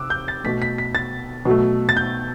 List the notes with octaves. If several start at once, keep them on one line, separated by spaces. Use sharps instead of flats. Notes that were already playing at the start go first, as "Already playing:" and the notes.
Already playing: C3 D6 E6 F#6
G6
A6
B2 A3 B6
B6
B6
A6
B2 F#3 A3
A6
G6